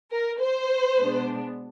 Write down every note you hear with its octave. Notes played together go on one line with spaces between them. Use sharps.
A#4
C5
B2 G#3 B3 D4